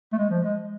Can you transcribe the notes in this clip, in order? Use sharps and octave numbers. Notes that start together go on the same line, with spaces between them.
A3
G#3
F3
G#3